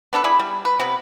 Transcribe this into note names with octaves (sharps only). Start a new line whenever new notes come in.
B3 D4 A4 B4
E4 G#4 D5 B5
G3
B4
C3 B3 B4